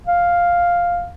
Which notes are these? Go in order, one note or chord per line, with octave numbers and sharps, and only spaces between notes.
F5